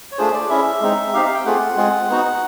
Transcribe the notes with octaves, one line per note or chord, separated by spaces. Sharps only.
C#5
A3 D4 F4 G#4 C5
D5
C#4 E4 G#4 E5
G#3 C4 D#4
C4 D#4 G4 F5
F5
G5
A3 C4 F4 G#4 F#5
G#3 C4 F4 G#4
B3 D#4 F#4